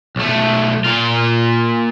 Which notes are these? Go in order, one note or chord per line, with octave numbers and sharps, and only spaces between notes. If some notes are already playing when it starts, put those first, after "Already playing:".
B1 A3
A#2 F4